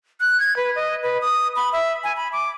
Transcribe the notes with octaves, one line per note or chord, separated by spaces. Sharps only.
F#6
G#6
B4
D#5
B4
D#6
B5
E5
G#5
B5
D6